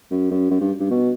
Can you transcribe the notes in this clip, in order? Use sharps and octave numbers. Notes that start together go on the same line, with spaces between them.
F#2
F#2
F#2
G2
G2
B2